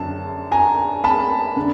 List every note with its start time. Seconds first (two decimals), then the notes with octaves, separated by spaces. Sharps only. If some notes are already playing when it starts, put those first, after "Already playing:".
Already playing: F#2 D3 A5
0.52 G#5 A#5
1.04 A5 B5
1.56 D3